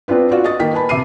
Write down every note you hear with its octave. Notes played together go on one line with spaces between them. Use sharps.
B3 C4 D4 F4 B4
F4 F#4 D5 F5
D#5 C#6 D#6 A6
D#3 A#3 G5 B6
B4 G#5 A5 B5
C3 E5 D6 C7 D#7